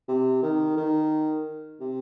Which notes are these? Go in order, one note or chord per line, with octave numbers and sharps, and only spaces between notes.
C3
D#3
D#3
C3